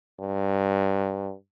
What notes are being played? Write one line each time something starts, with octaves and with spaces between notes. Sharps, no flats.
G2